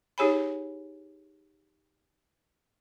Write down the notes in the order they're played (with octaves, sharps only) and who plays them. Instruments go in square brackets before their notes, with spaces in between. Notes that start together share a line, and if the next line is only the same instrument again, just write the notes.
[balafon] D#4 G4 G#4 C#5 G#5 B5